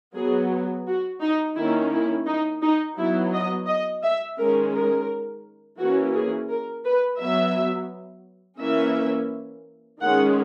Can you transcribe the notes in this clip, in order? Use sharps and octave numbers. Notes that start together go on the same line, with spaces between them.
F#3 B3 G#4
F#4
D#4
D#3 A#3 C#4 E4
E4
D#4
D#4
F#3 B3 E4
D#5
D#5
E5
D#3 G#3 C#4 A#4
A#4
E3 A#3 C#4 F#4
G#4
A#4
B4
F#3 B3 E5
E3 A#3 C#4 E5
D#3 G#3 C#4 F#5